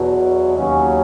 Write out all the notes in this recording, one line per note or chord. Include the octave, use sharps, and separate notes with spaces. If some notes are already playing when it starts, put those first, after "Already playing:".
Already playing: E2 B2 F#3
D#2 C#3 F#3 C#4